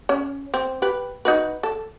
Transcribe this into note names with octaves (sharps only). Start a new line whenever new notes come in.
C#4
C4
G4 B4
D#4 F#4 B4
A4